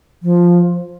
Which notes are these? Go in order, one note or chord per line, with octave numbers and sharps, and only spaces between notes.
F3